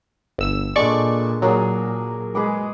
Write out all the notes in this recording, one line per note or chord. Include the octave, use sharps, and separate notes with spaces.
G1 E6 E7
A#2 G#3 D4 A4 D5 C#6
A#2 F#3 G#4 A#4 D5
G#3 G#4 B4 D6